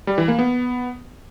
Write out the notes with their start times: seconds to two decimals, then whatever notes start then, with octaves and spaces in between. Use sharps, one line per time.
0.07 G3
0.18 E3
0.28 A#3
0.39 B3